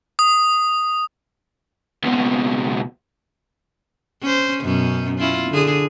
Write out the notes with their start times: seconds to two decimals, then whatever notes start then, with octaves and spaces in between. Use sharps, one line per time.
0.19 D#6
2.04 C#2 B2
4.22 C#4 C5
4.63 F#2 B2 C#4
5.19 C#4 E4 F4
5.50 D3 G#4